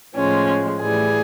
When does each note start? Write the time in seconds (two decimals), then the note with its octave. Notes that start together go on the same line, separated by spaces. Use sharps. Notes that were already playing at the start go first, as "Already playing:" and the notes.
0.16 A2 F3 G#3 C#4
0.81 A2 E3 G3 G#4